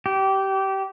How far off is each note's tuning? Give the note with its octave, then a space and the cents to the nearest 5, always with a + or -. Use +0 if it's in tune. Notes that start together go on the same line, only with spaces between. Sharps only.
G4 -20